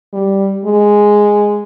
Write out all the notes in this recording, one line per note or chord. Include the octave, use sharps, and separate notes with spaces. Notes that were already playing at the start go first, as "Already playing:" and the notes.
G3
G#3